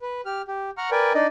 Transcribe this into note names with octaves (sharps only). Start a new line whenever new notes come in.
B4
G4 F6
G4
F#5 A#5 C#6 F6
A#4 B4 D5 G5 G#5
D4 D#4 D5 D#5